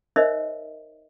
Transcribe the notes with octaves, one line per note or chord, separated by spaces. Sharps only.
D#4 A#4 C5 C#5 D#5 E5